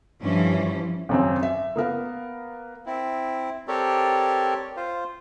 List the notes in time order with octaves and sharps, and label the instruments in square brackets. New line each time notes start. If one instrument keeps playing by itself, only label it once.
[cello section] G2 E3 F3 C#4
[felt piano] G#1 F#2 C4
E5
A#3 B3 A#4 F5
[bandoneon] C4 E4
C4 G4 A4 A#4 C#5 D5
F4 C5